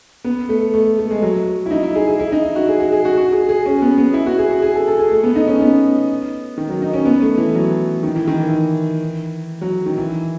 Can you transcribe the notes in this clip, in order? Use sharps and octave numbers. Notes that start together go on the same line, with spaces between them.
B3
A3
A3
A3
G#3
F#3
E4
D#4
E4
G#4
G#4
E4
D#4
F#4
G#4
F#4
G#4
F#4
F#4
G#4
G#4
C#4
B3
B3
E4
F#4
G#4
F#4
G#4
A4
A4
G#4
A3
B3
D#4
C#4
B3
D#3
F#3
D#4
C#4
B3
A3
E3
F#3
D#3
E3
D#3
E3
F#3
D#3
E3